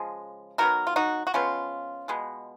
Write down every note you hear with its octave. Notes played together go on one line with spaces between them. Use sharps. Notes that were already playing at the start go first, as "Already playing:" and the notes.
Already playing: C#3 F3 G#3
D#3 F#3 B3 F#4 A#4
F4
D#4 F#4
F#4
F3 G#3 B3 C#4 F4
B2 G#3 B3